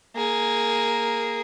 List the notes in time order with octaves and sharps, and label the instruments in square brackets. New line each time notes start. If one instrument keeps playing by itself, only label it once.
[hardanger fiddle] A#3 G#4